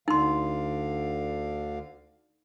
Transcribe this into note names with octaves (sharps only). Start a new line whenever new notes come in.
D2 D3 D#4 F5 C6